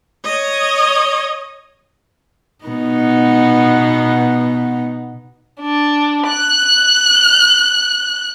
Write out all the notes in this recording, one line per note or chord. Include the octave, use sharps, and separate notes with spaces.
C#5 D#5
B2 B3 D#4
D4
F#6